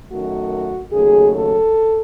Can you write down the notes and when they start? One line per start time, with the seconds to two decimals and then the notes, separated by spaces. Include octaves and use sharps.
0.11 F#2 D#3 A3 F#4
0.92 D#2 C#3 F#3 A3 G#4
1.34 A4